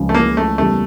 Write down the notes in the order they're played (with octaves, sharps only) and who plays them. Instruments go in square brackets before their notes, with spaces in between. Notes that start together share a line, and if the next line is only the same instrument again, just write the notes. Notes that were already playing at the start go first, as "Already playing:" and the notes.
Already playing: [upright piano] C#2 C#3 F3 C#4
[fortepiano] A3
A#3
A3
[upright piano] E2 C#3 G3 A#3 [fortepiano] A3